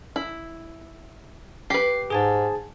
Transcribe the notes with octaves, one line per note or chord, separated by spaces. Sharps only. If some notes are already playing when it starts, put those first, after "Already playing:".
E4
G4 B4 C7
G#2 G#4 G#5 A5